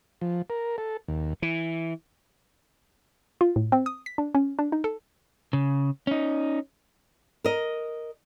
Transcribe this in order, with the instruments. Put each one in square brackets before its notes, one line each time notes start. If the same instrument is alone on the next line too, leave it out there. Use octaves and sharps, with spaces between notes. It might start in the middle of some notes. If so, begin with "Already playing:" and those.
[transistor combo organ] F3
A#4
A4
D#2
[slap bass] E3
[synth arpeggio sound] F4
A2
C4
D#6
B6
D4
C#4
D4
D#4
A4
[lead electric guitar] C#3
C#4 D#4
[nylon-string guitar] A#4 D#5